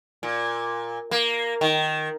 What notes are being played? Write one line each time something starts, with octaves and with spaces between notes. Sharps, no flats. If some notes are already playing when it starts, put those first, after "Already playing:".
A#2
A#3
D#3